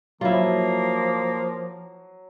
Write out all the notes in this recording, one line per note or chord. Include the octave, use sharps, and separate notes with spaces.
F3 F#3 A#3 E4 F4